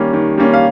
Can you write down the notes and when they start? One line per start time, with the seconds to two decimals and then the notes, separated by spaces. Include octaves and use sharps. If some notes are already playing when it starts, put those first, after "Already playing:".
Already playing: D#3 G3 A#3 C#4
0.13 D#3
0.38 G3 A#3 C#4
0.54 F5